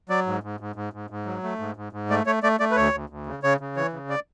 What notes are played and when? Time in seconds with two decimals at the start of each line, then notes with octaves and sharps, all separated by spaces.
0.09 F#3 D5
0.26 G#2
0.43 G#2
0.60 G#2
0.76 G#2
0.93 G#2
1.10 G#2
1.26 F#3
1.43 A3
1.59 G#2
1.76 G#2
1.92 G#2
2.10 A3 D5
2.26 A3 C#5
2.43 A3 D5
2.60 A3 D5
2.71 B4
2.76 D2 C#5
2.94 D2
3.10 D2
3.27 C#3
3.43 C#3 C#5
3.60 C#3
3.76 E3 C#5
3.93 C#3
4.10 D5